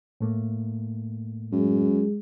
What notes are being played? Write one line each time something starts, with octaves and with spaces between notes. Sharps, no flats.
A2 A3 A#3
F#2 G#3